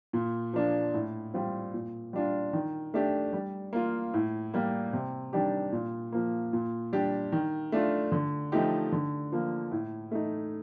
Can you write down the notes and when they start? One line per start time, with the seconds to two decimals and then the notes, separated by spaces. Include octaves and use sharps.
0.13 A#2
0.53 F3 A#3 D4
0.94 A2
1.34 G3 C4 F4
1.74 A#2
2.13 G3 D4 F4
2.53 D#3
2.94 A3 D4 G4
3.33 G3
3.73 A#3 F4
4.14 A2
4.54 G3 A#3
4.93 C3
5.33 D#3 G3 D4 G4
5.72 A#2
6.12 F3 A#3
6.53 A#2
6.93 G3 D4 G4
7.32 D#3
7.72 A3 D4 F4
8.12 D3
8.52 F3 A3 D#4 G4
8.92 D3
9.32 F3 A#3
9.71 A2
10.11 A3 D#4